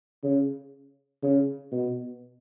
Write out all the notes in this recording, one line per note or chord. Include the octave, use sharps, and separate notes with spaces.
C#3
C#3
B2